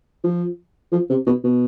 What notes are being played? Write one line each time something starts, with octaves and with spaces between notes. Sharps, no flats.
F3
F3
C3
B2
B2